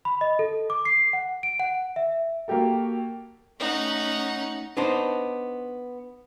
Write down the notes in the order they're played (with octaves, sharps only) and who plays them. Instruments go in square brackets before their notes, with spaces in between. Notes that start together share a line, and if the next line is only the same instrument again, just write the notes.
[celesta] B5
D#5
A4
D6
C7
F#5
D7
F#5
E5
[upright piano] A#3 F#4 G4 A4
[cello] A3 C#4 [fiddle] D#4 F#5
[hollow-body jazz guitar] B3 D4 D#4 C5